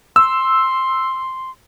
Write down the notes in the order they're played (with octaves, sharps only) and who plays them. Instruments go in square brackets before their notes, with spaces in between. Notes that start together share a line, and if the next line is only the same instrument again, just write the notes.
[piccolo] C6 [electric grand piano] E6